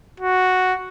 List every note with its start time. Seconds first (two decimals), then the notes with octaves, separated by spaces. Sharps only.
0.20 F#4